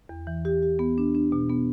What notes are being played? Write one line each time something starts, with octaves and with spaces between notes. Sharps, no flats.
E2
E3
G4
G4
B3
D4
D4
B2
B3